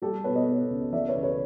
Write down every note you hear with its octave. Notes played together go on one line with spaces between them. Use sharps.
G3 G4 A4
B2 B4 C#5
C#5 D#5
B2
C#2
E3 D5 E5
B4 C#5
C#2
B4 C#5